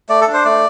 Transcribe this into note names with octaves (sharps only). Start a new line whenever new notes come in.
A3 D5
A4
D4
C5
A3 D5